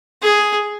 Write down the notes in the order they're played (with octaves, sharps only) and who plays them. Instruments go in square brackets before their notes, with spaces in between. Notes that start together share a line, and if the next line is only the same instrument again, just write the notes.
[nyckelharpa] G#4